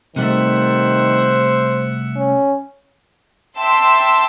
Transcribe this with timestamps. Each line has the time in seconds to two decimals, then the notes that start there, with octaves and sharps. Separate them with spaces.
0.16 C3 D#3 G3 A3 C5 E5 F#5
2.16 C#4
3.59 E5 G5 A5 C6 E6